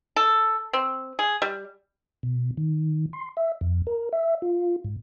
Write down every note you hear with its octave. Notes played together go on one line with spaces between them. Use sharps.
A4
C4
G#4
G3
B2
D#3
C6
E5
F2
A#4
E5
F4
G#2